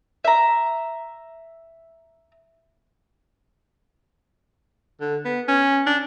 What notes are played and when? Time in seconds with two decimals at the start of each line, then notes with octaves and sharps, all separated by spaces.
0.25 E5 A#5
5.01 D3
5.25 B3
5.48 C#4
5.87 D4